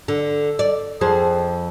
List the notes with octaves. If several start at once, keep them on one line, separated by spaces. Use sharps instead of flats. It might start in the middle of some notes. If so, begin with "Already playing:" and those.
D3
D5
F2 G#4 C5